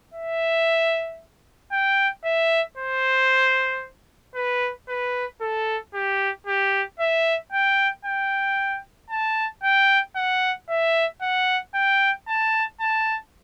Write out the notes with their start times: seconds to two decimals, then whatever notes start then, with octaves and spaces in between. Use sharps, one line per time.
0.14 E5
1.72 G5
2.25 E5
2.77 C5
4.35 B4
4.89 B4
5.41 A4
5.94 G4
6.47 G4
7.00 E5
7.52 G5
8.05 G5
9.10 A5
9.63 G5
10.16 F#5
10.69 E5
11.22 F#5
11.75 G5
12.28 A5
12.80 A5